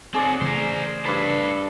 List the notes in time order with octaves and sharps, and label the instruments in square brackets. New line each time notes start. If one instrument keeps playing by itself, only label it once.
[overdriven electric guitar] C4 F#4 [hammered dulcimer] G#4 D5
[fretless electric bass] C#3 E3 A3 [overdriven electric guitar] A#4 C5
[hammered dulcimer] G2 B5 [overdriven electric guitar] A4 C5